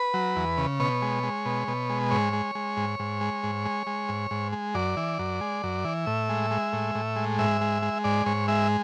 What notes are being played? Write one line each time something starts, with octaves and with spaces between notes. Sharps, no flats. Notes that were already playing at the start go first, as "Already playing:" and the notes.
Already playing: B4
F#3
E2
C#3
B2 C#5
G#3
G#3
B2
B2
G#3
G#2 C#5
G#3
G#3
G#2
G#2
G#3
G#2
G#3
G#3
G#2
G#2
G#3
F#2 D5
E3
F#2
G#3
F#2
E3
A2 E5
G#3
G#3
A2
A2
G#3
G#2 E5
G#3
G#3
G#2 D5
G#2 C#5
G#3 E5